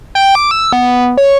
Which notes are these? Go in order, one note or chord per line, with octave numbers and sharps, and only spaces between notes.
G5
D6
E6
B3
C#5